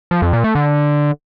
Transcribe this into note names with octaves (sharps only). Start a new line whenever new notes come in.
F3
F2
A#2
A3
D3